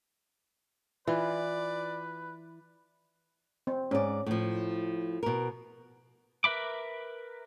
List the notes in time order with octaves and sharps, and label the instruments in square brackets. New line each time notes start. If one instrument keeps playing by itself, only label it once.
[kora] E3 [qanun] F4 [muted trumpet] B4 [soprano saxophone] D5
[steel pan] C4
[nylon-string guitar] G#2 D5 [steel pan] C#4
[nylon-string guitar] A2 F3
B2 A#4
[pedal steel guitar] A#4 B4 E5 B5 D6